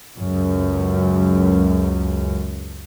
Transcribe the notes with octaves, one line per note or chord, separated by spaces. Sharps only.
C#2 F#2